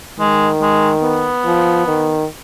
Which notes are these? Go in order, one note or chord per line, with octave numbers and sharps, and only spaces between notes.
D#3 G#3
G#3
B3
F3
D#3